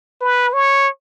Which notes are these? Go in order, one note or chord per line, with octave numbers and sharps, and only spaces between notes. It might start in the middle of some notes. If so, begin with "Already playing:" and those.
B4
C#5